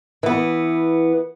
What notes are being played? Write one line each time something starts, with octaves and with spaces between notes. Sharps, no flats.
E3 B3